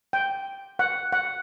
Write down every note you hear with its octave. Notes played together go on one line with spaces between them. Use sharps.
G5
F#5
F#5